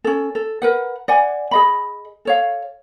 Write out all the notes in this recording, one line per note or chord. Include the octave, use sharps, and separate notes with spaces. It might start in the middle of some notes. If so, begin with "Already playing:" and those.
C#4 A4
A4
A#4 B4 F#5
D5 F#5 G#5
G#4 D#5 B5
A4 C#5 F5